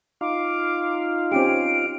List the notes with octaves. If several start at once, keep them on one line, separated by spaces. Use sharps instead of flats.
D#4 F4 F5 D6
C4 C#4 G4 D7